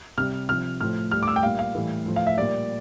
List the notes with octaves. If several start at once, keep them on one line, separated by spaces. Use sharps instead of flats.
C3 G3 F6
C3 F3 F6
A2 F3 F6
A2 G3 F6
D6
E6
G5
A#2 G3 F5
F5
A2 E3 G3
A2 F3
F5
E5
A#2 G3 D5